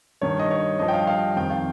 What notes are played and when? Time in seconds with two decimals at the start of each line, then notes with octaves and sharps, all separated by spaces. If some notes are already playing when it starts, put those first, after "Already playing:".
0.21 G2 D#3 C#5
0.39 D#5
0.51 C#5
0.79 G2 F3 D#5
0.88 G5
0.93 F5
1.07 F5
1.36 F2 D#3 G5
1.50 F5